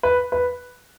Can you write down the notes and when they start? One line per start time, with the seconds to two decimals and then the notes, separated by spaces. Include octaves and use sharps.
0.03 B4
0.32 B4